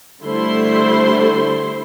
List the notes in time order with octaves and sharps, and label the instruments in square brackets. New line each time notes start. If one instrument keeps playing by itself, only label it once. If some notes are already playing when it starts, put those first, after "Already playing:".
[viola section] D3 G3 A3 E4 C5 C6